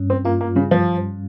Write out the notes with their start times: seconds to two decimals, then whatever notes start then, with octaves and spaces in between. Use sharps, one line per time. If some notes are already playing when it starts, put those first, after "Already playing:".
Already playing: G2 C#4
0.10 C4
0.25 A#3 F4
0.41 A#3
0.55 C#3 G3
0.71 F3